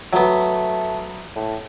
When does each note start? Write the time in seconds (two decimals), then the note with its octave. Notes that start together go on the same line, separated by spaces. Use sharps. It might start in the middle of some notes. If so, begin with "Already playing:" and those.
0.13 F#3 A3 B3
1.36 A2